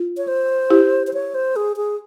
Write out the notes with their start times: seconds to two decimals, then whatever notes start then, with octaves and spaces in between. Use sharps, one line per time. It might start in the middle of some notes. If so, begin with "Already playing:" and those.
Already playing: F4
0.17 C#5
0.28 C5
0.70 E4 G4
1.07 C5
1.14 C#5
1.34 C5
1.56 G#4
1.77 G#4